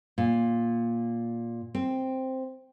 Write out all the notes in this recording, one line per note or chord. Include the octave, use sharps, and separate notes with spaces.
A#2
C4